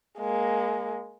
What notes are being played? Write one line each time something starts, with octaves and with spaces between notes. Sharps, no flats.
G#3 A#3